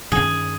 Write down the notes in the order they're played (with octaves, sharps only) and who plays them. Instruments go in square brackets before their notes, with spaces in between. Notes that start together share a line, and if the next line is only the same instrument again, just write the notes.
[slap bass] G2 D#3 G#3 C#4 [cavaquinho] G#4